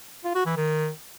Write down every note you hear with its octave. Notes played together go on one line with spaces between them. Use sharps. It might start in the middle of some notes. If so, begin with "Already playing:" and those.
F4
F#4
E3
D#3